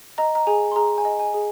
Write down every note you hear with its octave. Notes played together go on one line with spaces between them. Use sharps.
D#5 A#5
A#5
G#4 G#5
C6
G#4 A#5
G#5
D#5
G#5
G#4